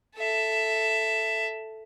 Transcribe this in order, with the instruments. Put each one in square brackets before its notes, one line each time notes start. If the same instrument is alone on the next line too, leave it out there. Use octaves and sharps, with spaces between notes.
[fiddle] A4 E5